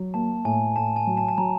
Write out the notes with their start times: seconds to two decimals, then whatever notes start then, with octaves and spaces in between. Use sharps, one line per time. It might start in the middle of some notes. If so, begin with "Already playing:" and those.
Already playing: F#3
0.14 A#3 A5
0.45 A2 G#5
0.76 A2 A5
0.96 G#5
1.07 F#3
1.17 A5
1.29 A5
1.38 F#3 A#5